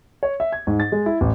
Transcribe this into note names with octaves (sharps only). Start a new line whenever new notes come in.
C#5
E5
G#6
G#2
A6
G#3
E4
A1